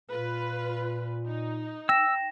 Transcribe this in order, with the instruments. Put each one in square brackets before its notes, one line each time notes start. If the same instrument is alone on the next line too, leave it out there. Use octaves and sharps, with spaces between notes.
[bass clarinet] A#2 [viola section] F4 B4
[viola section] D#4
[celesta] G5 A#6 E7 [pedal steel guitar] E6